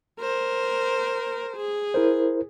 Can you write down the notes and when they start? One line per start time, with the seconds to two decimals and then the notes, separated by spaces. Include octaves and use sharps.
0.20 A#4 C5
1.57 G#4
1.94 E4 A#4 C5